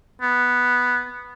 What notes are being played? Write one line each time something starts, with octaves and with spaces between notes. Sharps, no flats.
B3